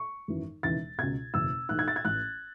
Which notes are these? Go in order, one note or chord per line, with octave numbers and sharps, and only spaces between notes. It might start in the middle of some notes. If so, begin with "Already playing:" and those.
Already playing: C#6
G#1 F#2 E3
E1 D#2 C#3 E3 A6
C#2 B2 G#6
F#1 E2 B2 E6
B1 A2 E3 F#6
G#6
A6
G#6
A1 A2 E3 F#6